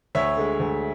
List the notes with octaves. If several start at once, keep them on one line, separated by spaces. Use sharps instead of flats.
D2 C#5 E5
D3 G#3
D2